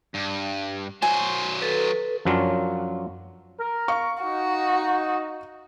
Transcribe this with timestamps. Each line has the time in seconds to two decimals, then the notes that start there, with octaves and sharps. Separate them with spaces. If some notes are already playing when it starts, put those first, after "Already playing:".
0.14 G2
1.02 F#3 C5 G#5
1.61 A4 B4
2.25 F#2 F3 F#3 C#4 D4 F4
3.58 A#4
3.88 F5 C#6
4.23 D#4 F#4